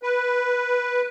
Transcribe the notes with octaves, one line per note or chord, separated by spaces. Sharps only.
B4